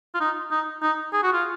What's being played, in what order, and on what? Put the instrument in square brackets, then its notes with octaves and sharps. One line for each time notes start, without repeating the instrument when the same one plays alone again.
[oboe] F4
D#4
D#4
D#4
G#4
F#4
F4